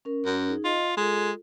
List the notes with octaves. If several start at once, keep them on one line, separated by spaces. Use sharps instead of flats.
C#4 A#4
F#2
D#4 G#4
F4 D#5
G#3 F4 A4